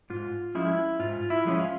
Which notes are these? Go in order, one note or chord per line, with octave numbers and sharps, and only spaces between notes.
G#2 F4
F3 G#3 C#4 E4
G#2 F4
E4
F3 G#3 C#4
F4